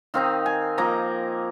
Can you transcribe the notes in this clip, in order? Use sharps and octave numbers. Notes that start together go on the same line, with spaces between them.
D#3 C4 D#4 F5
G#5
F3 A#3 D#4 A#5